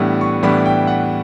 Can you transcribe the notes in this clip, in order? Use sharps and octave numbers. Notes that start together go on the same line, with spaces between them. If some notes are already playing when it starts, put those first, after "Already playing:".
Already playing: A2 E3 G3 B3 D4
C#6
A2 E3 G3 B3 D4 B5
G5
F#5